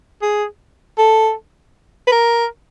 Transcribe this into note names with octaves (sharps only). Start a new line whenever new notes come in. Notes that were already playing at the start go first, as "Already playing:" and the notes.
G#4
A4
B4
A#4